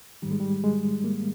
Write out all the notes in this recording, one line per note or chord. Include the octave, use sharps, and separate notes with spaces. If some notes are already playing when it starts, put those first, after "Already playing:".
G#2 D#3 G3
G#3
G3
G#3
A#3